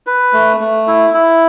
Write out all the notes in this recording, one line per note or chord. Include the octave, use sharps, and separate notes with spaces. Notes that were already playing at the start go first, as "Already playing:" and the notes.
B4
A3
A3
E4
E4